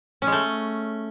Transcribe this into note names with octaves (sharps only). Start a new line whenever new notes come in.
C#4
G#3
A3